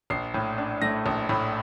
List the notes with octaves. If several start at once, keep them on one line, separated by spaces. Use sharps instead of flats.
A#1 C7
A2
D4
A3 A#6
A#1
A2